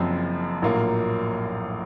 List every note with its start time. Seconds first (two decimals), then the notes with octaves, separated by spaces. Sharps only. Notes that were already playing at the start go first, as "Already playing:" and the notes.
Already playing: F#1 F#2 F3 C4
0.62 A#1 A2 F#3 A#3 F4